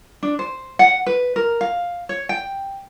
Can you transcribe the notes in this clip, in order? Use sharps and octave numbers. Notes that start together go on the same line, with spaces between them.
D4
C5
F#5
B4
A#4
F5
C#5
G5